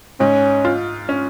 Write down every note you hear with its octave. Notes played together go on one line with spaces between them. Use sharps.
G#2 C#4
F4
C#4